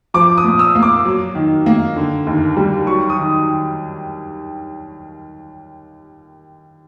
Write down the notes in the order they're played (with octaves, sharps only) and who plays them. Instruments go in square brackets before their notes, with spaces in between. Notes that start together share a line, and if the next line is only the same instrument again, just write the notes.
[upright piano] F3 [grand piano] D6
[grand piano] D#6
[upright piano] A#2
[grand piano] E6
[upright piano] A#3
[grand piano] D6
[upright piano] F#3
D#3
A#3
D3
D#2
G3
[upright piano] F#3 [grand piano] C#6
[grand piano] D#6
[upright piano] D#3